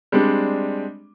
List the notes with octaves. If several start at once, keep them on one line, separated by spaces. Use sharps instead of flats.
G3 G#3 C4 D4